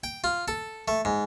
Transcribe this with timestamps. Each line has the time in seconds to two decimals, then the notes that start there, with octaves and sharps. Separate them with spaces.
0.04 G5
0.24 F4
0.48 A4
0.88 A3
1.05 G#2